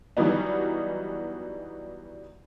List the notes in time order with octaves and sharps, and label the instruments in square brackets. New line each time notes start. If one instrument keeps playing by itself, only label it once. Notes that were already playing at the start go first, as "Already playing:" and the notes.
[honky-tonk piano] E3 F#3 G3 B3 D#4